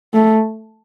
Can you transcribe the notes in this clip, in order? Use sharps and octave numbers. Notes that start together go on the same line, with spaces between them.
A3